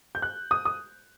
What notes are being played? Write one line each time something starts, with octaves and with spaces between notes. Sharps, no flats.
G6
F#6
D#6
D#6